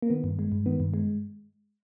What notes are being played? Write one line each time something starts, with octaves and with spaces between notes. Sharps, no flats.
A#3
D#3 B3
G2
G#3
G2
D#3 B3
G2
G#3